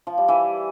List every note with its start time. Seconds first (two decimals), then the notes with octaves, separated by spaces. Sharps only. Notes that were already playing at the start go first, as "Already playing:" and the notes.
0.07 F3
0.18 G3
0.28 E3